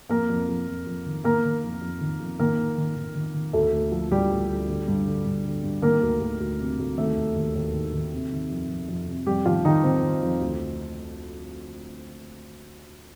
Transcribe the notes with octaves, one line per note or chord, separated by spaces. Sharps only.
F2 A#3 A#4
F2
F2
F2
F2
D#3
D#3 A#3 A#4
D#3
F2
F2
D#3
F2
D#3 A#3 A#4
D#3
D#3
D#3
D#3
D#3
D2 A3 A4
D2
F3
D2 G3 G4
D2
D2
D3
G2
D3
G2
D3
G2
D#3 A#3 A#4
D2
D2
D2
C3
D2
D#3 A3 A4
D#2
D#2
D#2
D#3
D#3
C3
D#3
F2
F2
F2
C3
F2 G3 G4
D#3 F3 F4
D#3 D#4
D#3 C4
D#3
F2
D2